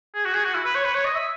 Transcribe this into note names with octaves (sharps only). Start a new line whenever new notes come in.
G#4
F#4
G#4
F#4
E4
B4
C#5
B4
C#5
D#5
E5